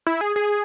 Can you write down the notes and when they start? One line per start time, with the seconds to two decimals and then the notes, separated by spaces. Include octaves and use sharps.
0.07 E4
0.21 G#4
0.36 G#4